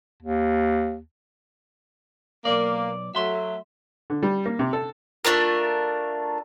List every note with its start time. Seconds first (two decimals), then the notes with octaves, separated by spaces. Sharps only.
0.23 D#2
2.45 B1 A#3 D5
3.15 F#3 A3 E5 C6
4.10 D3
4.23 G3
4.46 A#3
4.59 C3
4.73 A4
5.25 A3 D4 F4 A#4